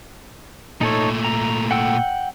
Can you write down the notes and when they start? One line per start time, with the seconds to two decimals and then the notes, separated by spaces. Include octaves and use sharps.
0.81 A#2 A3 D#4 A4 C#5
1.25 A#5
1.71 F#5 G5 E6